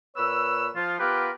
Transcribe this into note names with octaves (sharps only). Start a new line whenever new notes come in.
A#2 B4 C#5 E6
F3 F4
B3 F4 G4 A#4 B4